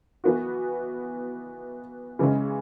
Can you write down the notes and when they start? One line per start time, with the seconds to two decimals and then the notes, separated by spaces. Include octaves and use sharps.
0.24 E3 B3 F#4
2.19 C#3 E3 G#3 C#4